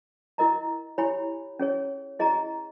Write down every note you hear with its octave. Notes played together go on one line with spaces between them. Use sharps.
E4 A#4 D#5 A#5
E4 G4 C#5 G#5 B5
C#4 G#4 C#5
E4 G#4 D#5 A#5